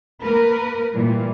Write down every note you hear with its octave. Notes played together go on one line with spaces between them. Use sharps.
A#3 A#4 B4
A#2 E3 G3